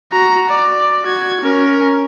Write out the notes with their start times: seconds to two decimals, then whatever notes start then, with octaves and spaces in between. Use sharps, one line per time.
0.12 F#4 A#5
0.50 D5
1.04 F#4 G#6
1.42 C#4 A#4